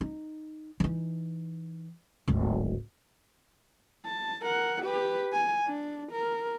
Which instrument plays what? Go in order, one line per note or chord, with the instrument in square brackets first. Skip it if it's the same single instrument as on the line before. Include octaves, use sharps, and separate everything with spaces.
[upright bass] D#4
E3 D#4
D1 G#1
[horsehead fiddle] A5
A#4 F#5
G4 B4
G#5
D4
A#4